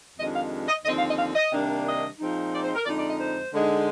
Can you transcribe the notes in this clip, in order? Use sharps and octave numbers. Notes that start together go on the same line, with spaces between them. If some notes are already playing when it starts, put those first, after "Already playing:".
F2 C3 D#3 G#3 D4 D#5
F5
D#5
D#2 D3 F3 C4 D#5
F5
D#5
F5
D#5
C3 D#3 G3 A#3 D4
D#5
A#2 F3 G#3 C4 D#4
D5
C5
A#4
F2 D3 G#3 D#4 D5
D5
D#5
C5
D3 G#3 D#4